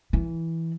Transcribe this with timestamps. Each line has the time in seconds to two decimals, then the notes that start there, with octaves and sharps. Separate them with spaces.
0.13 E3